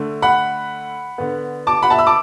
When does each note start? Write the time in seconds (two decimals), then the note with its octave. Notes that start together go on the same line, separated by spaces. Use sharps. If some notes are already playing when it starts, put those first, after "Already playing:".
Already playing: D3 A3
0.22 F#5 B5
1.18 D3 B3
1.67 A5 D6
1.83 F#5 B5
1.90 E5 A5
1.99 B5 E6
2.07 A5 D6